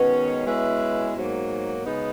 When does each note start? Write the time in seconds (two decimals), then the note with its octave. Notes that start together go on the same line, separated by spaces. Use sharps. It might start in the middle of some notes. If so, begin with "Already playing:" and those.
Already playing: B2 D#3 G#3 C#4 F#4 C#5
0.46 G#3 C#4 E4 B4 E5
1.16 G#2 F#3 A#3
1.85 C#3 G#3 B3 D#4